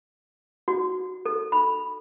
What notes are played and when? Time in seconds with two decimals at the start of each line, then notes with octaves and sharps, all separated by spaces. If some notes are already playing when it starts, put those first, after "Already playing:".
0.68 F#4
1.26 A4
1.52 B5